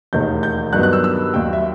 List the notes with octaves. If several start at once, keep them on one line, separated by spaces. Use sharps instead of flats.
E1 D#2 D#3 A3 D#4 G6
G6
G2 D#3 F#3 B3 F#6
F#6
E6
E6
D#2 D#3 F#3 G5
E5